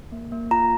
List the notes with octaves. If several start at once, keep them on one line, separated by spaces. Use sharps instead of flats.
A#3
A#3
F4 A#5